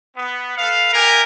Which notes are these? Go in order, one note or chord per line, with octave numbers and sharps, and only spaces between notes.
B3
A4 B4 F5
E4 G4 A#4 G#5